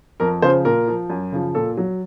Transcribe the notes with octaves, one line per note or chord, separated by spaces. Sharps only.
F2 A#4
C#3 F3 C5
A#2 A#4
F3
F#2
C#3 F3
A#2 A4
F#3